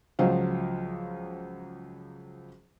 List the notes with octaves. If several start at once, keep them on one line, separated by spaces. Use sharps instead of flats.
C#2 F3 F#3 C5 F5